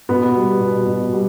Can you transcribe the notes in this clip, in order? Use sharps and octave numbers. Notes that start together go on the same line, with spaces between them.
B2 B3
G3
B2
B2
G3